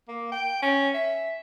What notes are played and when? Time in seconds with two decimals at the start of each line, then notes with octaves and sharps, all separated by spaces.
0.08 A#3
0.32 G5
0.62 C#4
0.94 E5